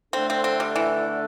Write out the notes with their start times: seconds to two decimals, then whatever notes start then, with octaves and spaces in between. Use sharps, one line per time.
0.13 D3 A3 C4 D4 A4
0.30 C4
0.44 C4
0.60 G3
0.76 E3